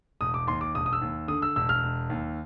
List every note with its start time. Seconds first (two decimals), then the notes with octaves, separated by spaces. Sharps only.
0.21 E1 D#6
0.34 D6
0.47 D#2 C6
0.61 D6
0.75 E1 D#6
0.86 D#6
0.93 E6
1.02 D#2
1.28 D3 D#6
1.42 E6
1.56 E1 E6
1.69 F6
1.83 E1
2.10 D#2